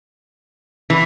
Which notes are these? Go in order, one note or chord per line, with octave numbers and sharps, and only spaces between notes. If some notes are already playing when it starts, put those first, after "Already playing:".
E3